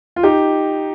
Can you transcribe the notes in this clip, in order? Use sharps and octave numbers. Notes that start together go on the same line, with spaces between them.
F4
D#4 G4